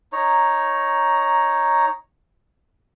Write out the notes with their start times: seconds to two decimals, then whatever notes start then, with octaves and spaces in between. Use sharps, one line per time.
0.12 D#4 C#5 A#5